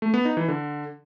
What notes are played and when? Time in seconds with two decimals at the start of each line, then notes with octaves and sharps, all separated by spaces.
0.02 A3
0.14 B3
0.25 D#4
0.37 E3
0.48 D3